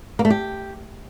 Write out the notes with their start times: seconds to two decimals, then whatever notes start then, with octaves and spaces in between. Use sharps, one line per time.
0.19 A#3
0.25 A3
0.30 G4